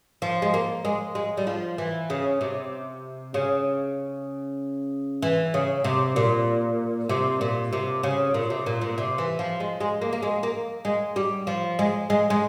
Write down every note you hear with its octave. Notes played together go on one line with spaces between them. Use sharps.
F3
G#3
A#3
G#3
G#3
G3
F3
E3
C#3
C3
C#3
E3
C#3
C3
A#2
C3
A#2
C3
C#3
A#2
C3
A#2
A#2
C3
E3
F3
G#3
G#3
A#3
A#3
G#3
A#3
G#3
G3
F3
G#3
G#3
G#3